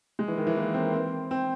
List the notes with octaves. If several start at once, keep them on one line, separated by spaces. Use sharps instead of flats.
G#3
E3
D#3
E3
A#3
C4
C4
C4